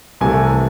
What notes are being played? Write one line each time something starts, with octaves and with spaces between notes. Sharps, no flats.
C2 C3 E3 A3 G#5